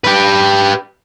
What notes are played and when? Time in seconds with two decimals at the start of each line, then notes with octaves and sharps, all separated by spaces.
0.04 G4 B4